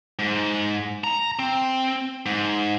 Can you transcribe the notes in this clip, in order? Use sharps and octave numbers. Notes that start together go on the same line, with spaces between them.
G#2
A#5
C4
G#2